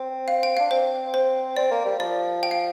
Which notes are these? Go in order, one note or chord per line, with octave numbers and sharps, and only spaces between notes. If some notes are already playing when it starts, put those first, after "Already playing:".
Already playing: C4 C5
F5
G5
D4 F5
C4 C5
C5
C4 D5
A#3
G3
F3 D5
G5
F5